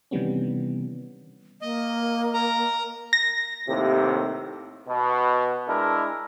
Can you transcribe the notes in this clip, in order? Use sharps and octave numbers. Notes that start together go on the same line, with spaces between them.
C3 D#3 E3 G3 B3 C#4
A#3 D#5
A#4 A#5
A#6
D#2 A2 C3
B2
G#3 D4 E4 A#4